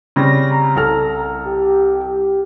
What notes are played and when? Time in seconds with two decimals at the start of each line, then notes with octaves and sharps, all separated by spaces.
0.16 C#3 G3 C4 A#6
0.51 A#5
0.76 C2 A4 F6
1.45 G4